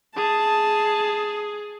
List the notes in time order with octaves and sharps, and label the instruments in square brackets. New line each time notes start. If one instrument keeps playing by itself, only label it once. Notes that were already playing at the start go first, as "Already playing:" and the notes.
[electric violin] G#4 [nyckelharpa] A5